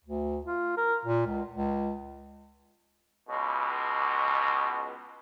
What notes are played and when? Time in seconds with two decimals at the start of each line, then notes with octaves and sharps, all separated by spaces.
0.05 D2
0.46 F4
0.77 A#4
1.05 A#2
1.26 C#2
1.53 C#2
3.29 C#2 B2